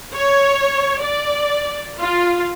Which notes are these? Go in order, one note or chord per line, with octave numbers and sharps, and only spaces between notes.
C#5
D5
F4